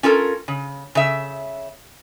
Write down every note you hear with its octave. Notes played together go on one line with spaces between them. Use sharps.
C#4 F4 A4 A#4
C#3
C#3 E5